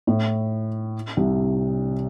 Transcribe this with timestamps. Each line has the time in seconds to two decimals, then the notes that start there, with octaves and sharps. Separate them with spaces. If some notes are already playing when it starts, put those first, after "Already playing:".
0.07 A2
1.17 C2 C3